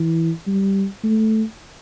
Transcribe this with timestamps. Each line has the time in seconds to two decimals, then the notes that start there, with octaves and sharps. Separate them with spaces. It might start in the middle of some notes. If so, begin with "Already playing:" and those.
Already playing: E3
0.47 G3
1.03 A3